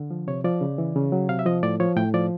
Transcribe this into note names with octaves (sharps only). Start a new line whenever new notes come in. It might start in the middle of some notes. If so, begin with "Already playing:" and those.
Already playing: D3
F3
C3 C#5
F3 D5
C#3
E3
C#3
F#3
C3 F5
E5
F3 D#5
A2 D5
F3 C#5
A2 G5
F3 D5